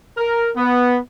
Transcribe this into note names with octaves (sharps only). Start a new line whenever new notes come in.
A#4
B3